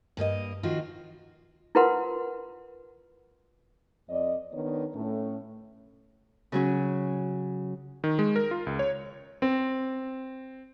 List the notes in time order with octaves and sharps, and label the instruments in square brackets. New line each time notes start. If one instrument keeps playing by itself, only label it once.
[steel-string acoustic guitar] G2 A#3 A4 D#5
D#3 F3 F4 F#4
[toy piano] E4 F4 A#4 B4 F#5 C6
[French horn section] F2 D5 D#5
D#3 B3 D4 C#5
A2 A3 C#4
[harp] C#3 F#3 C#4
[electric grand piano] D#3
G#3
A#4
F4
C#2
C#5
[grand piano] C4